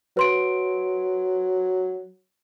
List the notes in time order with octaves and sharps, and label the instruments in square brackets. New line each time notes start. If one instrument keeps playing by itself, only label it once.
[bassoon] F#3 [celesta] B4 C6 D7